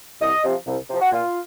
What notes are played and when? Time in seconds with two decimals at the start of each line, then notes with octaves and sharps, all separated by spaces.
0.21 C2 D#5
0.43 C3 F3
0.66 C2
0.89 C3 F3
1.00 F#4
1.12 A#2 F4